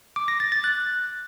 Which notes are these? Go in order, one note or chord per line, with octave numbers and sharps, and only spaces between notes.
D6
A#6
A6
A6
F#6